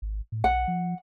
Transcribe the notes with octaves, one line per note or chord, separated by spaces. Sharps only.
G#1
A2
B1 F#5
F3